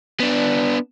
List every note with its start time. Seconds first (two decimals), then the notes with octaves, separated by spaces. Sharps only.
0.20 B3 D4